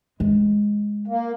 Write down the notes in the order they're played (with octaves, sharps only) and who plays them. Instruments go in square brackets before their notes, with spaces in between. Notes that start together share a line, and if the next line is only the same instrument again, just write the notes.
[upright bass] G#3
[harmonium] A#3